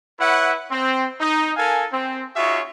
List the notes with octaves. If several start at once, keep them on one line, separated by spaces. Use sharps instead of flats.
E4 B4 C#5 E5 F#5
C4
D#4
A4 A#4 F5 G#5
C4
D#4 F4 F#4 G#4 C#5 E5